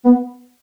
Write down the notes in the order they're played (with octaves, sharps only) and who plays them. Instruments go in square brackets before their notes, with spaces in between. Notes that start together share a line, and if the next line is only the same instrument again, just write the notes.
[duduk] B3